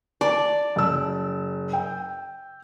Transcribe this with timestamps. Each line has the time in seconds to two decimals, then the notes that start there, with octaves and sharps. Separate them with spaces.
0.21 D5 A5
0.76 F#1 E6
1.73 G5